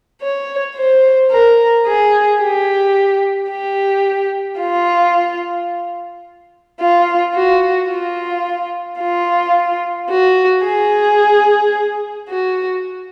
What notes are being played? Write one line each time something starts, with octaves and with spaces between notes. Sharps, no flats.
C#5
C5
A#4
G#4
G4
G4
F4
F4
F#4
F4
F4
F#4
G#4
F#4